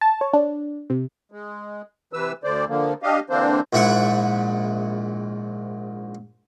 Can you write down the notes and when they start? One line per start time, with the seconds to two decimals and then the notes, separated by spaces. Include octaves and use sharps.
0.01 A5
0.21 C#5
0.33 D4
0.90 C3
1.32 G#3
2.13 C3 E3 B4 E6
2.44 D2 D3 C5 D5
2.69 D3 F3 A#3
3.03 D4 G4 D#5 F5
3.30 D3 E3 A#3 C4 D4 C5
3.73 A#1 G#2 E4 E5 F#5